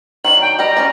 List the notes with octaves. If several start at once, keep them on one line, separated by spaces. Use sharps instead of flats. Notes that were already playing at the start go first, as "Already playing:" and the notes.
D#3 F#3 D4 F#7
G5
G3 G4 D#5 A#5
B3 C#4 D5